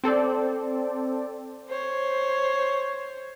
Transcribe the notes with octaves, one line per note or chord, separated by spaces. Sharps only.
C4 A4 C5 D5
C5 C#5